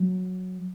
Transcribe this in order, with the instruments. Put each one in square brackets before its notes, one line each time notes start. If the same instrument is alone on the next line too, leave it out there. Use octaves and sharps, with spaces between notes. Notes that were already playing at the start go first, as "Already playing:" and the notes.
Already playing: [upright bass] F#3